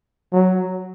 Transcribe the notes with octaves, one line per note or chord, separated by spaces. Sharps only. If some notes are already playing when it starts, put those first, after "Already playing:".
F#3